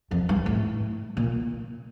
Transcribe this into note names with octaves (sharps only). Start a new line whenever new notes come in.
F2
G2
A2
A#2